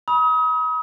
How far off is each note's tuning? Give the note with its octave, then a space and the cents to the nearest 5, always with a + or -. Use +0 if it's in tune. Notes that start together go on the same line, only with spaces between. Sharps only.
B5 -30 D#6 +35